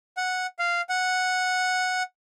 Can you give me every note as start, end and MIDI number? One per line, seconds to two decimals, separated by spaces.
0.17 0.47 78
0.59 0.81 77
0.89 2.03 78